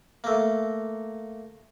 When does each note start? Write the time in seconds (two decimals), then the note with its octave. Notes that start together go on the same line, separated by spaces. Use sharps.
0.24 A3 A#3